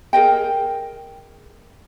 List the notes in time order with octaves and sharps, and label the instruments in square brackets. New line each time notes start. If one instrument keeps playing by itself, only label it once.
[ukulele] G#4 A#4 D#5 G5